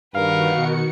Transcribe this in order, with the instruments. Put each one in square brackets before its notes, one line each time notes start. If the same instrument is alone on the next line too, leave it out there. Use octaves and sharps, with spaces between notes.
[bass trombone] G2 [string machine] D#3 F#4 C#7 [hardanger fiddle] A#4 B4 [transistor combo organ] F5
[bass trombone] B2